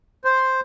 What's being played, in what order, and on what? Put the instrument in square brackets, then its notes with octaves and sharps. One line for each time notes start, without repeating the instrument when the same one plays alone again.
[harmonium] C5